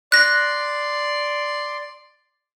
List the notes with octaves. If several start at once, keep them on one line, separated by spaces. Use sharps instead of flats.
D5 C6 F#6 A#6